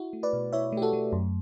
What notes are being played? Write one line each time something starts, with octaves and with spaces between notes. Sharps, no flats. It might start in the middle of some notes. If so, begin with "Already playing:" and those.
Already playing: E4 F#4
A3
B4 D5
B2
E4 C#5 E5
A3 G4
F#4 A4
A3
F#2